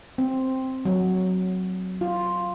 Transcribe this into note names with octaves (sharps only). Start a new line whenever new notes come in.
C4
F#3
F4